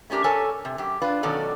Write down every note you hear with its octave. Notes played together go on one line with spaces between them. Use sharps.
A3 C#4 D4 G4 A#4
A4 A#4 C#5 G#5 A5
C3
F#2 G4
D4 F4 B4
B2 D#3 F#3 C#4 A4 D5